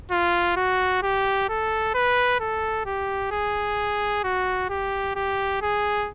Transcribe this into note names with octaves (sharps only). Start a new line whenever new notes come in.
F4
F#4
G4
A4
B4
A4
G4
G#4
F#4
G4
G4
G#4